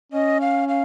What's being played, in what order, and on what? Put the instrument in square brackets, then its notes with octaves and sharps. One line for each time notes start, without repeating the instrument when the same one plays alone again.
[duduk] C#4 [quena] D#5
[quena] F5
F5